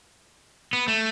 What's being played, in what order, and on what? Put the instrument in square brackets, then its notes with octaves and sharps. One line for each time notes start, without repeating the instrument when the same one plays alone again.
[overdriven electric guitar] B3
A3